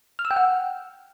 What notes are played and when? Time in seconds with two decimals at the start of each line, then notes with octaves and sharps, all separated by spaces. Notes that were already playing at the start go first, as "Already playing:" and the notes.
0.19 F6
0.25 E6
0.31 G5
0.36 F#5